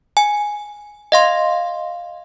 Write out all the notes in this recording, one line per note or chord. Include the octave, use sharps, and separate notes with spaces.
G#5
D#5 F5 C6